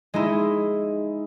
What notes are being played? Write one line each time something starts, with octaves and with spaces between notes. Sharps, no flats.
G#3 D#4 E4